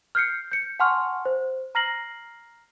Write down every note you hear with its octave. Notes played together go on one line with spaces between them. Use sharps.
F6 G6 C7 C#7
G6 C#7
F#5 G#5 A5 C6 C#6 F6
C5
A#5 F6 A#6 C7 F#7